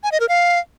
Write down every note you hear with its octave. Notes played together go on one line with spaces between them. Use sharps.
G#5
D#5
A#4
F5